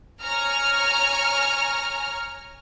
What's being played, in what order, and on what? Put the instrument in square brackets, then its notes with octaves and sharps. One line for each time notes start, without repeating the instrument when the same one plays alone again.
[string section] C#5 G#5 A#5 F6